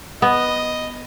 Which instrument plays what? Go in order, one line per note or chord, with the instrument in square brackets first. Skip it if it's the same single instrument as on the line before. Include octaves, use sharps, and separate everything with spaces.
[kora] B3 [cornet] D#5